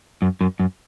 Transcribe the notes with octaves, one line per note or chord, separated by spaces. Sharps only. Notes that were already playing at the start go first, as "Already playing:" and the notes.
F#2
F#2
F#2